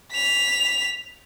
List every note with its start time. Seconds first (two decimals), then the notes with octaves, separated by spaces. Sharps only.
0.13 B6 F7